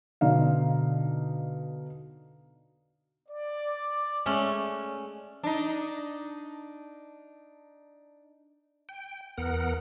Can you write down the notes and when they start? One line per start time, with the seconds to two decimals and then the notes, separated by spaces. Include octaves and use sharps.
0.21 B2 D3 D#4 F5
3.29 D5
4.26 G#3 A3 C#4
5.43 D4 D#4
8.89 G5
9.38 E2 B3 A#4 F#5